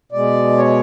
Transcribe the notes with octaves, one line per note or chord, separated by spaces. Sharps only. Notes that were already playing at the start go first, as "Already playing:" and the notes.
B2 G#3 D5
C#5